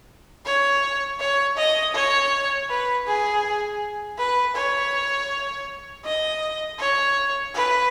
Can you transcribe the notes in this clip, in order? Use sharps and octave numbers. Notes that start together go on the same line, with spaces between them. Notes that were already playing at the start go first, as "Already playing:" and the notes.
C#5
C#5
D#5
C#5
B4
G#4
B4
C#5
D#5
C#5
B4